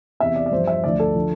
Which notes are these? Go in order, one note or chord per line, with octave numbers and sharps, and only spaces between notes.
E2 C3 E3 E5
D5
D5
G2 F3 C5
E5
D2 D3 F3 D5
A4
D3 F3